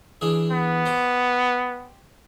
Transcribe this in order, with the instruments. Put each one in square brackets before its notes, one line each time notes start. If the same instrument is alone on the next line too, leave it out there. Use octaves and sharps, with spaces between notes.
[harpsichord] E3 D4 G#4
[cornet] B3
[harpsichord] G4 C5